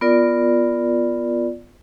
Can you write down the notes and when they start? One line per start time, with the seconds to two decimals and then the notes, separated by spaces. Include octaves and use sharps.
0.01 B3 F4 A#4 D5